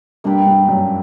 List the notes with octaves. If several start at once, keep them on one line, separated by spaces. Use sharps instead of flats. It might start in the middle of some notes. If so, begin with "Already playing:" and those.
G2 A#3 D4 G4 B4
G2
F#2